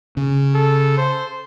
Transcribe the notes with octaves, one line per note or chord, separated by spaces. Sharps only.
C#3
A4
C5